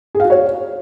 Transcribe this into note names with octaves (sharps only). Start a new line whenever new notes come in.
G#4
F5
F#4
C#5